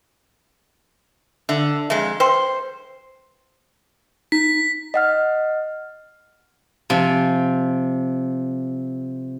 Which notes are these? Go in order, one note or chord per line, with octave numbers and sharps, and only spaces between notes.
D3 E5
F2 G#3 E5
B4 C5 G5 C6
D#4 B6
D#5 F#5 F6
C3 F3 G#5